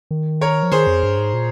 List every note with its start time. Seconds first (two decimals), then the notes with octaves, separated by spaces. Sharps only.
0.11 D#3
0.41 A#4 C#5
0.63 F3
0.72 D#3 G#4 C5
0.87 F2
1.03 G2
1.18 G#2
1.34 A#2